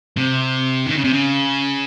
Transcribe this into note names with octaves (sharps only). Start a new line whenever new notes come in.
C3
D#3
C#3
C3
C#3